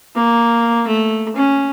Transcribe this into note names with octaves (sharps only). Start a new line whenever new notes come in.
A#3
A3
C#4